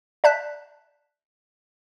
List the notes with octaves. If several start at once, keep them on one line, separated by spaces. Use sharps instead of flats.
D5 E5 A5 F#6 G6 B6